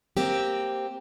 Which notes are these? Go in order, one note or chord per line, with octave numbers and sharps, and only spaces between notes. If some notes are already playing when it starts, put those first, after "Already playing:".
A#3 C4 G4